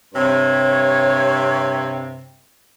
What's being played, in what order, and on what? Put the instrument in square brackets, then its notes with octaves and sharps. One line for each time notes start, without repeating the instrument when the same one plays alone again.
[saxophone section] G2 C3 [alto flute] C#5